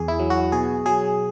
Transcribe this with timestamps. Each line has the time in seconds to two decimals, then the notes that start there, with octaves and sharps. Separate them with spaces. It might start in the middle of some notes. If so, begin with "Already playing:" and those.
Already playing: E2 G#4
0.08 E4
0.19 F#3
0.30 F#4
0.52 B2 G#4
0.86 F#3 G#4